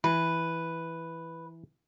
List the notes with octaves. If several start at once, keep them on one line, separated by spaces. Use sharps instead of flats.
E3 B4